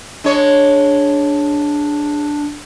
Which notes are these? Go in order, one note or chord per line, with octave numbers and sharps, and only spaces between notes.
G#3 D4 C#5